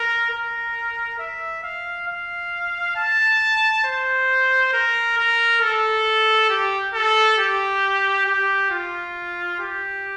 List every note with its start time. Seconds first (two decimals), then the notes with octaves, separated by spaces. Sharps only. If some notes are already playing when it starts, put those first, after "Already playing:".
Already playing: A#4
0.31 A#4
1.19 E5
1.63 F5
2.08 F5
2.96 A5
3.85 C5
4.73 A#4
5.17 A#4
5.61 A4
6.50 G4
6.94 A4
7.38 G4
8.26 G4
8.70 F4
9.60 G4